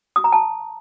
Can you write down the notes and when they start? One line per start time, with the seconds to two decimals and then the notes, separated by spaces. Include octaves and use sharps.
0.16 D#6
0.24 A#5
0.32 A5